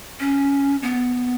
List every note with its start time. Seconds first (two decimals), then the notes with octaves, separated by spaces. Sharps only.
0.20 C#4
0.82 B3